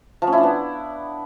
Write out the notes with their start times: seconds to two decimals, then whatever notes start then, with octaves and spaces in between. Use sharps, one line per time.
0.22 F3
0.27 C#4
0.32 E4
0.38 D4
0.43 B3